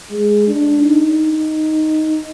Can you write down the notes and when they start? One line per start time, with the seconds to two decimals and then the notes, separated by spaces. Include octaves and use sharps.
0.11 G#3
0.48 D4
0.83 D#4